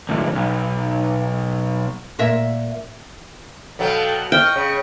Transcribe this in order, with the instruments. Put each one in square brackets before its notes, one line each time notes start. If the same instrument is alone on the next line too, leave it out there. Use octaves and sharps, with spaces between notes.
[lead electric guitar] D2 G#2
B1
[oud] A#2 A#4 E5
[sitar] B2 F#3 [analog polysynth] A4 F5 G5
[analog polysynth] D#5 C#6 [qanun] G5 [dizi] F6
[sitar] C#3 [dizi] C#5